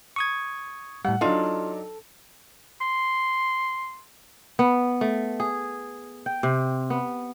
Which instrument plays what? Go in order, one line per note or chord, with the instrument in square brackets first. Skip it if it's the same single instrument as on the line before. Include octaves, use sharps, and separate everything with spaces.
[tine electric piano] C#6 D#6 G#6
[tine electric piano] A2 G3 [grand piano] F#5
[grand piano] F#3 D4 D#4 [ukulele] F4 F5 [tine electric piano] A4
[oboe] C6
[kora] B3
A3
G#4
G5
C3
B3